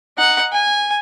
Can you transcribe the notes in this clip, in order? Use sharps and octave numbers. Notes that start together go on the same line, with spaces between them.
D#4 F#5
G#5